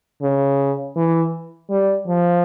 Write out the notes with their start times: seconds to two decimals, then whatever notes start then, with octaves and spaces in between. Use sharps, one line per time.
0.22 C#3
0.96 E3
1.70 G3
2.07 F3